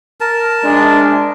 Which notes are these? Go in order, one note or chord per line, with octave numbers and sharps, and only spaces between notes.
A#4 A5
G#3 D4